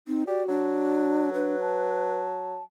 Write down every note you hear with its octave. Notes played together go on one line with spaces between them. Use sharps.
C4 D#4
F#4 G4 D5
F#3 D4
D4 B4
A5